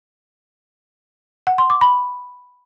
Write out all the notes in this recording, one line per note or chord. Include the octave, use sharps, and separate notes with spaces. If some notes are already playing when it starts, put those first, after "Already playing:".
F#5
C6
D6
B5